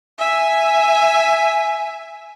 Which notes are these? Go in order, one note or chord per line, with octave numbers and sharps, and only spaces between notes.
E5 G#5